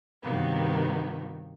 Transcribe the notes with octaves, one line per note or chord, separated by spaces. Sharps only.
G2 C3 D#3 F#3 A#3 B3